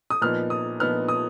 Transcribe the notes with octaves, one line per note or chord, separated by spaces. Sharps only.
D#6
A#2 F3 B3 D#4 F6
D#6
A#2 F3 B3 D#4 F6
D#6